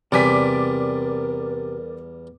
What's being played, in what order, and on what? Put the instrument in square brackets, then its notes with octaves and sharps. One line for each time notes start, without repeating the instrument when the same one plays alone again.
[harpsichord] E2 G3 G#5 [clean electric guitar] C3 [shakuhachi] A#4 [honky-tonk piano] D5 D6 B6